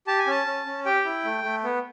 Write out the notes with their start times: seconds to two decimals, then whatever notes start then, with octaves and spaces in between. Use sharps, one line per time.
0.07 G4 A5
0.19 G#5
0.27 C#4 A5
0.46 C#4
0.66 C#4
0.85 G4 G5
1.05 E4
1.24 A3
1.44 A3
1.64 B3